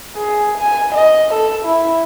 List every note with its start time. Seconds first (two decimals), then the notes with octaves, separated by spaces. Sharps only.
0.17 G#4
0.58 G#5
0.95 D#5
1.34 A4
1.65 E4